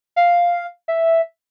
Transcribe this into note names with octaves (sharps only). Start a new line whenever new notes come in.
F5
E5